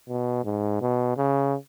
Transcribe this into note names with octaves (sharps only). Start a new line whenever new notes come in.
B2
G#2
B2
C#3